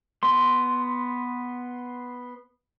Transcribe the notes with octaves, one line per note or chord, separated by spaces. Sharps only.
B3 C6